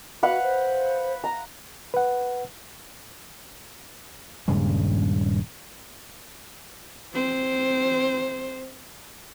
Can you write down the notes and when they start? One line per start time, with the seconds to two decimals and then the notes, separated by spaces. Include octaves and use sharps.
0.23 F#4 B4 F5 F#5
0.43 C5
1.24 A#5
1.94 B4 F#5
4.48 D#1 G2 C#3 G#3
7.14 C4 C5